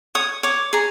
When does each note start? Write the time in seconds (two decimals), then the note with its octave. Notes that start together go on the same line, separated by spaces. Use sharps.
0.15 C#5 D#6
0.43 C#5 D6
0.73 G#4 A#5